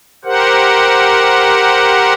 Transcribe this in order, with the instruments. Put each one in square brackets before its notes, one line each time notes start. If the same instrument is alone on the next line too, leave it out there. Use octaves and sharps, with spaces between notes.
[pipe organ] G4 A#4 C5 F#5